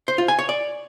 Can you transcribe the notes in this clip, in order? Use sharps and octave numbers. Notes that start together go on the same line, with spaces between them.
C5
F4
G#5
C#5
D5